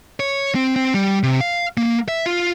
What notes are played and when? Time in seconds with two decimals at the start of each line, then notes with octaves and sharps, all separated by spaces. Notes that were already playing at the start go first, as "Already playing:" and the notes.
0.20 C#5
0.55 C4
0.76 C4
0.94 G3
1.23 C3
1.41 F5
1.77 A#3
2.08 E5
2.26 F4